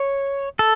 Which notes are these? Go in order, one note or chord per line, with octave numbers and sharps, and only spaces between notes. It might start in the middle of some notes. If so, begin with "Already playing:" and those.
Already playing: C#5
A4